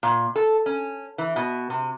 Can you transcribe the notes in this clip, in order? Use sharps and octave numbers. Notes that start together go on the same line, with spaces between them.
A#2
A4
C#4
E3
B2
C3